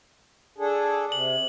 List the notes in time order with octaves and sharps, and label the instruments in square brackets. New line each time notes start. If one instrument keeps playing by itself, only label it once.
[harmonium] D4 G#4 A4
[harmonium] C3 [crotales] F#7